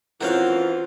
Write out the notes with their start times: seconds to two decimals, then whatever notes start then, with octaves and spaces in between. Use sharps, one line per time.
0.21 E3 C4 C#4 F4 F#4 A#4 C5 F5